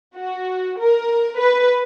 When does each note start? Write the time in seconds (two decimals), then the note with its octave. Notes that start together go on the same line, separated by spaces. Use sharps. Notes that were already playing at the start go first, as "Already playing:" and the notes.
0.16 F#4
0.78 A#4
1.39 B4